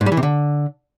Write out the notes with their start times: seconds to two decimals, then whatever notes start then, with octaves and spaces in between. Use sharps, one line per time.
0.01 G#2
0.06 G3
0.12 E3
0.17 C3
0.23 D3